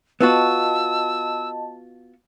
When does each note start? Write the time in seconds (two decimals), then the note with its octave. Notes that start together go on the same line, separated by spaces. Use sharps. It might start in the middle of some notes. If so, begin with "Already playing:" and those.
0.21 B3 F4 F#4 D#5 A5 E6